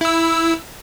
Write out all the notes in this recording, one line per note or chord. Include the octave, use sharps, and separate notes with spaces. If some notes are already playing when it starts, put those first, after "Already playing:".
E4 E6